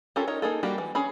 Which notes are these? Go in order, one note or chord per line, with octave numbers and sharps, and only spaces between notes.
C#4 F4 G4 A4 A#4
D#4 A#4 C#5
A#3 D#4 G#4 A4
G3 A#3 F#4 G4 G5
E3
C#4 G#4 B5